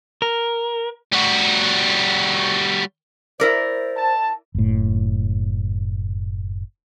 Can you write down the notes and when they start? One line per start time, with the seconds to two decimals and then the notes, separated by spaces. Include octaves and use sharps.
0.22 A#4
1.13 G3 F#4
3.40 E4 A#4 C5 D5
3.96 A5
4.55 F#1 A2